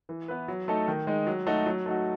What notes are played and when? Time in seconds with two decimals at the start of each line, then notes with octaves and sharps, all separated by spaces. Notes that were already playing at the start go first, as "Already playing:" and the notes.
0.09 E3
0.28 B3 E4 B4
0.48 F#3
0.68 A3 D#4 A4
0.88 D#3
1.07 G#3 D#4
1.27 F#3
1.47 A3 D#4 F#4
1.66 F#3
1.86 A3 D#4 F#4